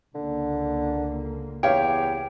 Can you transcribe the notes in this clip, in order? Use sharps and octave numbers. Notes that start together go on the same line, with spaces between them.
C#2 D3 A#3
E2 G4 C#5 F5 G5